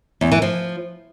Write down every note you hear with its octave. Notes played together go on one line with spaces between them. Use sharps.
E2
E3
F3